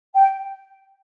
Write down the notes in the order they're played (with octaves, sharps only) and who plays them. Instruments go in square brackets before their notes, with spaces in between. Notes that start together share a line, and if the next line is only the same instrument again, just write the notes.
[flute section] G5